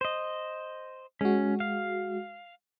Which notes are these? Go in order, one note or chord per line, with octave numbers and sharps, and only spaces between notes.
C5 D#5
G#3 C#4 F#4
F5